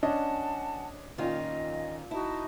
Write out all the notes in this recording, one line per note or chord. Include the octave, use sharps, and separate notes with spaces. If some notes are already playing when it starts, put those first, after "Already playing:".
C#4 D4 D#5 F#5 G#5 A5
A#2 D#3 C#4 F4 D#5
D#4 E4 F#4 A5